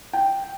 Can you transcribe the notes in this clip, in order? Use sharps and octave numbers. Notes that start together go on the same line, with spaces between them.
G5